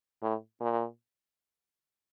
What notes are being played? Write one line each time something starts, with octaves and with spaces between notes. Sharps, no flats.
A2
A#2